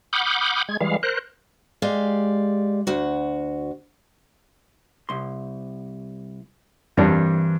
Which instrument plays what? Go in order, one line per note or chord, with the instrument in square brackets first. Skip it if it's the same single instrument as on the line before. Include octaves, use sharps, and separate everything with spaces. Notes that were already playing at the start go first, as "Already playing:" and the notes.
[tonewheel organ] F#5 B5 D6 D#6 F6 G6
G#3 G#6
E3 G3 G#3 F5
A#4 C5 F#6
[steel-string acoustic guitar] G#3 G4 D5 F5
D2 F#4
[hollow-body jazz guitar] C2 C6
[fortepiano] G2 D4 [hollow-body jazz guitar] E3 C4 A#4